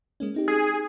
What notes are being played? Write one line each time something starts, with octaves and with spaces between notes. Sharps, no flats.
G#3 A#3 C#4
C4 D#4 G4
G#4